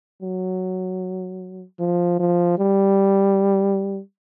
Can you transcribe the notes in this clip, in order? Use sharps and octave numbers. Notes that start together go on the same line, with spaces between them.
F#3
F3
F3
G3